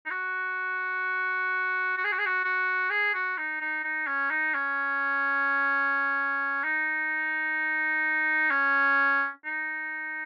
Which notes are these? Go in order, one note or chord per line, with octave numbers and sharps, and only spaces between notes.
D#4
F#4
F#4
G#4
F#4
G#4
F#4
F#4
G#4
F#4
D#4
D#4
D#4
C#4
D#4
C#4
D#4
C#4
D#4